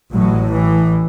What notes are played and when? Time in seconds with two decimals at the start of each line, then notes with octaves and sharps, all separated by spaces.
0.13 A1 A2 F#3
0.52 E3